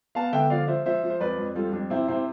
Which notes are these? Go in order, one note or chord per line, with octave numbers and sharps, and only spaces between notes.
B3 F5 A5
D3 E5 G5
F3 D5 F5
F3 C5 E5
F3 C5 E5
F3
C5
F2 B4 D5
F2
G3 F4 A4
F2 D4
C3 C4 E4
C3 C4 E4